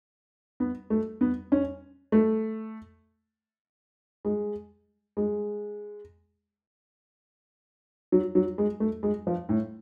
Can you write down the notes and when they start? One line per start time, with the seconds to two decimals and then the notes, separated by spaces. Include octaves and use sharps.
0.60 B3
0.90 A3
1.21 B3
1.52 C#4
2.12 A3
4.25 G#3
5.17 G#3
8.12 F#3
8.35 F#3
8.58 G#3
8.80 A3
9.03 G#3
9.27 F3
9.49 A2